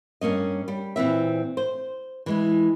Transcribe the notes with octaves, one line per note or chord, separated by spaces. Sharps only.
G2 A#3 C#4 D#5
G3
A#2 E3 C4 E5
C5
E3 G#3 E4